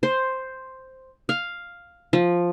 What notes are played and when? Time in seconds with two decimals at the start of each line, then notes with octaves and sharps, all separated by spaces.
0.03 C5
1.29 F5
2.13 F3